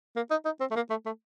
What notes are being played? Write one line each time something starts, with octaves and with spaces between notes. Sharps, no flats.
A#3
D#4
D#4
C4
A3
A#3
A3
A3